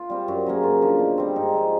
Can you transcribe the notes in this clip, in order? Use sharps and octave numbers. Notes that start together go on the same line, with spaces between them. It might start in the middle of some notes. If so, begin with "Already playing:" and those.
Already playing: F4
G3 C4
F#2 F#4
C#3 F#3 A#3
F#2 F4
D3 F3
B2
G3 C4
G#2 D#4
F3 G#3